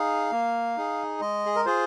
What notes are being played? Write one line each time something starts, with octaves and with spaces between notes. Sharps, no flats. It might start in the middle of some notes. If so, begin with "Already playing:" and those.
Already playing: D#4 G#4 F5
A#3
D#4 G#4
G#3 D#5
G#4
A#4
F4 G#4 C5